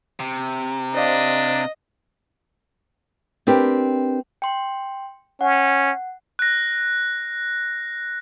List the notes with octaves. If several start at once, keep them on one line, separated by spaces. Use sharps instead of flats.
C3
D4 C5 D5 D#5 F5
C4 D4 G4 A#4 B4
G5 C6
C#4 F#5
F#6 A#6